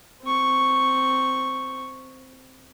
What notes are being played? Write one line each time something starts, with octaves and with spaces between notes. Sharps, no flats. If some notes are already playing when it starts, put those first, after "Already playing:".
C4 C#6